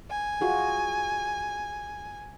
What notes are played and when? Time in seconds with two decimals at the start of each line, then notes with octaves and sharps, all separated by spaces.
0.10 G#5
0.41 F4 F#4 G#4